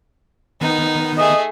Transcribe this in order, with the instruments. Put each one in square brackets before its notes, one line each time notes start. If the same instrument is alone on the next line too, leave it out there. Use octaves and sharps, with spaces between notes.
[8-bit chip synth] D#3 B3 [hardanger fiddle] D#4
[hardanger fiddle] A3 G#4 [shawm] D#5